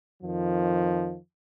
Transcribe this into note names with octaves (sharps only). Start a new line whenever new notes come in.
F2 D#3 F3